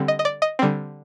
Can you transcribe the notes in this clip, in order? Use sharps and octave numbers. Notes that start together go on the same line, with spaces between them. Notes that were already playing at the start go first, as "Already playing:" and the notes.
Already playing: D3 G3 C4
D#5
D#5
D5
D#5
D3 G3 C4